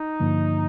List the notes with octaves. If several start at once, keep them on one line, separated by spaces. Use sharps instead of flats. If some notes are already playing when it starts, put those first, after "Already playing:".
Already playing: D#4
G2 D3 F3 A#3